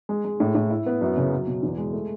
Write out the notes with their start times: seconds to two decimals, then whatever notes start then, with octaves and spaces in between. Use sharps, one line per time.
0.09 G#3
0.25 G#3
0.40 A2
0.55 A2
0.70 E4
0.86 B3
1.01 F#2
1.17 C#3
1.32 F#3
1.47 B2
1.63 E2
1.78 G#3
1.93 A3